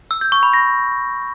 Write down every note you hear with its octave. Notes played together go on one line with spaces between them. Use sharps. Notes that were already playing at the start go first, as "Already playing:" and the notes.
E6
G6
C#6
B5
A#6